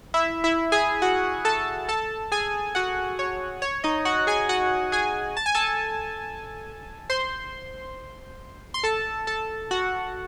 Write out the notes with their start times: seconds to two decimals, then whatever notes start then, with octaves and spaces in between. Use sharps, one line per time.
0.14 E4 E5
0.44 E4 E5
0.72 G#4 G#5
1.02 F#4 F#5
1.45 A4 A5
1.89 A4 A5
2.32 G#4 G#5
2.75 F#4 F#5
3.19 C#5
3.62 C#5
3.84 D#4 D#5
4.05 F#4 F#5
4.27 G#4 G#5
4.49 F#4 F#5
4.92 G#4 G#5
5.37 A5
5.46 G#5
5.54 A4 A5
7.10 C5 C6
8.74 C6
8.83 A4 A5
9.27 A4 A5
9.71 F#4 F#5